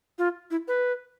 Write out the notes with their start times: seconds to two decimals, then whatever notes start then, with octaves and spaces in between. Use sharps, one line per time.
0.18 F4
0.51 E4
0.68 B4